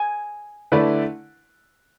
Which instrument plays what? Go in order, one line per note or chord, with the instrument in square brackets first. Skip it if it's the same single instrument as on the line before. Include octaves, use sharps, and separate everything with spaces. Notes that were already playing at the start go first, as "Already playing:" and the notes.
Already playing: [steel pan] G#5
[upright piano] D3 A3 E4 B4 D5